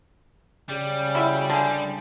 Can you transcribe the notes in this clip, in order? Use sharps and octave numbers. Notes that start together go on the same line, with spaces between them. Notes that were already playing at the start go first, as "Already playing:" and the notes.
C#3 G3
E4 F#4 E5
D3 G3 G#4